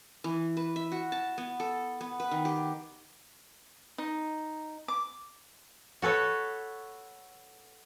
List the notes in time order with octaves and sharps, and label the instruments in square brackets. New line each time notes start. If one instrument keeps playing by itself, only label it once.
[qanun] E3
B4
E5
F#4
A5
B3
A4
B3
B4
D#3
G4
[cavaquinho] D#4
D6
[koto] F#4 A4 B4 C#5